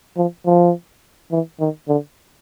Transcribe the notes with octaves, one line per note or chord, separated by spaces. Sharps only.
F3
F3
E3
D#3
D3